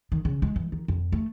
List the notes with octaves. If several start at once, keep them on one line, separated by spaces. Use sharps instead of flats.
D#3
C#3
G#3
E3
D#3
F2
A3